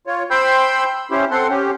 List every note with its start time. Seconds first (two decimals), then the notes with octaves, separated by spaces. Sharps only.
0.07 F4 C#5
0.31 C5 G5 B5 C6 E6 G6
1.11 C#4 E4 G4 C5
1.31 C4 A4 F#5 C6
1.50 C#4 G4